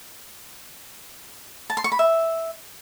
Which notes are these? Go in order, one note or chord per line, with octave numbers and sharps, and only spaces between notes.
A5
C6
C#6
B5
E5